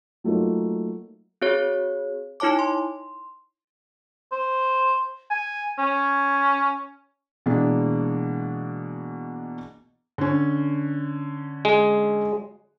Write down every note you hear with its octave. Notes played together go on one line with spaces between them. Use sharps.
F#3 A3 A#3 D#4 F4
C4 F#4 G#4 C#5
D#4 E4 C#5 A5 D6
C6
C5
G#5
C#4
B2 E3 G#3 A#3 D4
D3 C#4
G#3